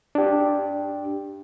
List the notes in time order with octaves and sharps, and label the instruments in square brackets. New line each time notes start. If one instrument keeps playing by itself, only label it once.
[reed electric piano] D4 G4